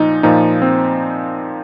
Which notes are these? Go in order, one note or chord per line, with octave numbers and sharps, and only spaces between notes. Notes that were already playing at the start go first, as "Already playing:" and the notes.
Already playing: A#2 F3 D#4
A#2 F3 D#4
C4